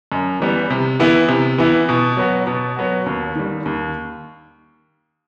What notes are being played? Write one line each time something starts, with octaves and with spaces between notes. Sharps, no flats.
F#2
E3 G3 B3
C3
E3 B3 E4
C3
E3 B3 E4
B2
F#3 B3 F#4
B2
F#3 B3 F#4
D#2
D#3 G3
D#2